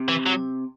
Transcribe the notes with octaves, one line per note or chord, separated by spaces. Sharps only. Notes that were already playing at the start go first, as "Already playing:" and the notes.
Already playing: C3
E3
F#3